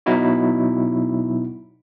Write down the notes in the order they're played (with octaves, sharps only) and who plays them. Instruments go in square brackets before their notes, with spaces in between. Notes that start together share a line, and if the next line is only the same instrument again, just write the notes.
[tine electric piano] B2 F#3 B3 D#4 E4 F#4